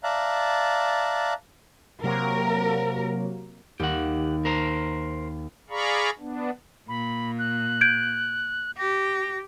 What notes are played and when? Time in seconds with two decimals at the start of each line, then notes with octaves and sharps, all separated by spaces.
0.04 D5 E5 F5 A5 A#5 F#6
2.03 C3 F#3 A#3 A#4
3.80 D#2 G4 F#5
4.45 A#4 C5 A#5
5.70 G#4 D5 F5 A#5 B5 C#6
6.19 B3 D4
6.88 A#2 B5
7.39 F#6
7.81 G6 G#6 D7
8.78 G4 A#6